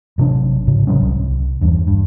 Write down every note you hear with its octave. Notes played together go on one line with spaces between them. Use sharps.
A1 C3 F#3 D4
G#2 C#3
C#3 F#3 G3 C#4
C2
E2 G2
G2